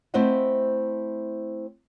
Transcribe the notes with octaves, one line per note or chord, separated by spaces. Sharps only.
A3 C4 E4 C5 D#5 F#5